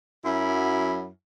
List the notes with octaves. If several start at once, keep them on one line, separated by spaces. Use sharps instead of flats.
F#2 F#3 E4 B5